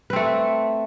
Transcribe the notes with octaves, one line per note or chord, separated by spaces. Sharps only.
A3 C4 B4